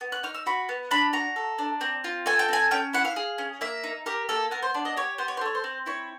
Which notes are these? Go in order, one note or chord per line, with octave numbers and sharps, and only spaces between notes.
B3
F#6
D#4 F6
E6
F#4 B5
B3
D4 B5
F#4 A#5
A4
D4
C4
F4
A4 G#5
G5
C4 G#5
C#4 G5
E4 F#5
F5
G#4
C#4
A#3 E5
D#4
G4 A#4
A#3 A4
B3 A#4
C5
D4
D#5
G4 C#5
B3 C5
C#5
C5
A3 C#5
C5
C4
E4 C#5